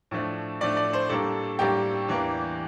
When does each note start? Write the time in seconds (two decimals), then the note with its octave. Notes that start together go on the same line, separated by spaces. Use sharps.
0.11 A2 F3 A3 D4
0.61 A2 F3 A3 D4 D5
0.77 D5
0.93 C5
1.10 A2 G3 A#3 D4 A4
1.59 A2 G3 A#3 D4 G4
2.08 E2 E3 A#3 D4